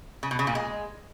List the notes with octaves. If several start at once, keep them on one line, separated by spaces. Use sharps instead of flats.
C#3
B2
C#3
A#2
G#3